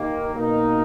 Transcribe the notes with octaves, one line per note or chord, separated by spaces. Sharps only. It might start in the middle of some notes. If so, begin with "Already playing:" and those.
Already playing: D#2 D#3 A#3
B2 A#3 D#4 A#4